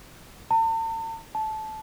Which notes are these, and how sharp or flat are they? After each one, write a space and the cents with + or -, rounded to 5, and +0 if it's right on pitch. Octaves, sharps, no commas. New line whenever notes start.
A5 +45
A5 -15